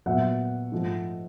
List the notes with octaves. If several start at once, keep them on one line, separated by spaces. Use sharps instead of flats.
A#2 F#3 B3 E5 F#5
G#2 F3 A3